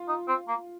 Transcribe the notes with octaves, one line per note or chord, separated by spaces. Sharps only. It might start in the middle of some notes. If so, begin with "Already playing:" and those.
Already playing: F4
D#4
C4
A#3